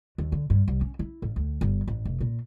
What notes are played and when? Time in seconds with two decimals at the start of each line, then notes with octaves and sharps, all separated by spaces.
0.18 D#2
0.32 D3
0.50 G2
0.68 C2
0.81 C#4
0.99 E4
1.22 A1
1.36 D2
1.61 G1
1.88 A1
2.05 F1
2.20 A#2